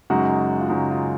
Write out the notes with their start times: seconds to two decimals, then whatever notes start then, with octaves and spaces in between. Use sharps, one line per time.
0.10 F#2 C#3 G#3 D#4 F#4
0.60 F4
0.69 F#2 C#3 G#3 D#4 F#4
0.90 F4